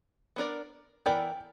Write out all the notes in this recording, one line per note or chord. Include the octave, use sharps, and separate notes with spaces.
B3 D4 A#4 D5
E3 B3 E4 A#4 D5 G5